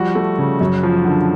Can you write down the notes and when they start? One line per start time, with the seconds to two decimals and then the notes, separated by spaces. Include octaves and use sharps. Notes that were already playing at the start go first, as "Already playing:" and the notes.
Already playing: F3 G3 F#4
0.15 A3
0.38 C#3
0.61 F#2
0.83 F3
1.05 D3